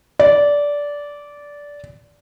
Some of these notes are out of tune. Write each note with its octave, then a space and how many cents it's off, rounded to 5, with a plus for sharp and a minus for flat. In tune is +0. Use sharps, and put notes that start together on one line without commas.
D5 -15